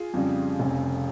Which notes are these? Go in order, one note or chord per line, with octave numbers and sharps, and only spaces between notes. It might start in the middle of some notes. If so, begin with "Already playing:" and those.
Already playing: F4 G#4
F2 C#3 G3
F1 F2 C#3